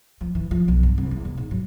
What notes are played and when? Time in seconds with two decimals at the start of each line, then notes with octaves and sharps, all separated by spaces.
0.21 F3
0.35 E3
0.51 F3
0.68 B1
0.83 G2
0.98 C2
1.11 E2
1.25 E1
1.37 G#2
1.51 F#3